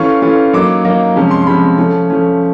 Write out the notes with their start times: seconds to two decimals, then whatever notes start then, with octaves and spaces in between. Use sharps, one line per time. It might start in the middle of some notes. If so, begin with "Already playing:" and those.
Already playing: E3 A3 C#4 F4 C#6
0.22 E3 A3 C#4 F4
0.53 F#3 A#3 D#4 D6
0.85 F#3 A#3 D#4
1.16 C3 F3 G#3 C#4
1.31 C6
1.42 C6
1.47 C3 F3 G#3 C#4 B5
1.78 F3 A3 C#4
2.10 F3 A3 C#4